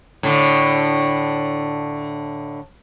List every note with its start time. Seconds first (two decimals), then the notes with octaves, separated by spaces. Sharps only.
0.23 A2 D3